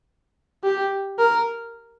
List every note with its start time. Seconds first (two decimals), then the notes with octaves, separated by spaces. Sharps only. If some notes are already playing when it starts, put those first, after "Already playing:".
0.64 G4
1.18 A#4